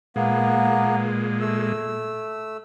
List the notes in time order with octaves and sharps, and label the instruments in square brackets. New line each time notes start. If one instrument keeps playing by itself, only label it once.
[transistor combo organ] A#2 G#3 [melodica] A#3 B3
[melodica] A3 E6